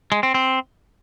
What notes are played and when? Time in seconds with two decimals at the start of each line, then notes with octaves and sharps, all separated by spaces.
0.12 G#3
0.23 C4
0.34 C4